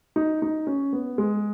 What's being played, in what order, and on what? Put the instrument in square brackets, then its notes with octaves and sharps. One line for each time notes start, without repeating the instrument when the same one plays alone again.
[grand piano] D#4
D#4
C#4
B3
G#3